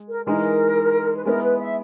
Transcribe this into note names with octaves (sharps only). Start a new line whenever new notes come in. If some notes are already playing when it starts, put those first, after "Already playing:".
Already playing: G#3
A#4
E3 G#3 D#4 A#4
B4
G#3 B3 E4 A#4
B4
E5